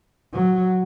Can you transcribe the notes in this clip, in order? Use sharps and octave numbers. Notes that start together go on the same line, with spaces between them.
F#3